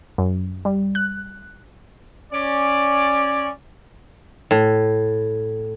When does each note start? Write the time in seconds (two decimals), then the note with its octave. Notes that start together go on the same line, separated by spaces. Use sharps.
0.18 F#2
0.65 G3
0.95 F#6
2.33 C#4 D5
4.51 A2